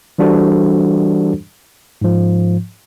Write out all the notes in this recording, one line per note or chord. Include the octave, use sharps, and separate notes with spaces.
E3 G3 D4 F#4 A4 C5
G#2 F3